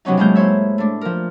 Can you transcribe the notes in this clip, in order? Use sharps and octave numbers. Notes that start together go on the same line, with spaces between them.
C3 F#3 B3 C#4 D#4
A2 F#3 G#3 A#3 A#5 G6
E4 C5 C#5 E5
A3 D4
F3 A#4